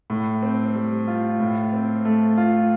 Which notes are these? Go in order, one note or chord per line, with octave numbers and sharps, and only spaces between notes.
A2
C4
G3
F4
A2
C4
A3
F4